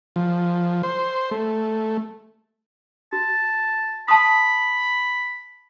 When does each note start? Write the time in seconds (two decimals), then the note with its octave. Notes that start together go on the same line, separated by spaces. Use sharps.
0.16 F3
0.83 C5
1.31 A3
3.13 F#4 A5
4.08 A5 B5 C6 D#6